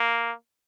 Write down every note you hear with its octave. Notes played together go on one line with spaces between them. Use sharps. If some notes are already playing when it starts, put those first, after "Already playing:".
Already playing: A#3